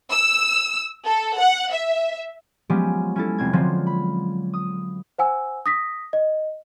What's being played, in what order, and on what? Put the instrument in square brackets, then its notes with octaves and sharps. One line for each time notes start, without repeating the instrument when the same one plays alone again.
[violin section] E6
A4
F#5
E5
[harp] F3 F#3 G#3 B3 C#4 G4
C#4 E4 A4
F1 C4 G#6
D3 F3 F#3 G#3 C4
B5
D#6
[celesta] C5 F#5 G#5 E6
D#6 A#6 B6
D#5